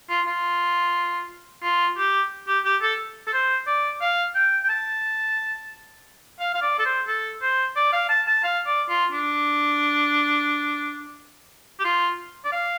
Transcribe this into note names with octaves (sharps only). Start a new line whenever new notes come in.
F4
F4
F4
G4
G4
G4
A4
A4
C5
D5
F5
G5
G5
A5
F5
F5
D5
A4
C5
A4
C5
D5
F5
A5
A5
F5
D5
F4
D4
G4
F4
D5
F5